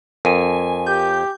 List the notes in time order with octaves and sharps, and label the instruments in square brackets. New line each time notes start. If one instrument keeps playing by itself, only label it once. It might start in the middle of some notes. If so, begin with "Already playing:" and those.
[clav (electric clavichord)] F2 [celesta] A#4 D#7 [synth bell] G#5
[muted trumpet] G4 [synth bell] G6